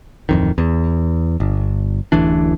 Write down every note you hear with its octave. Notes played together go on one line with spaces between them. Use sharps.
D1 F2 D#3
E2
G1
D1 A1 E3 D4